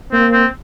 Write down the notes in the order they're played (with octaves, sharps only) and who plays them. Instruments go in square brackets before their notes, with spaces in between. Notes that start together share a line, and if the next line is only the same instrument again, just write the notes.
[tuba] A#3 [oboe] C4
[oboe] C4